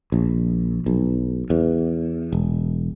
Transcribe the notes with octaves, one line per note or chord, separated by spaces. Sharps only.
A#1
B1
E2
E1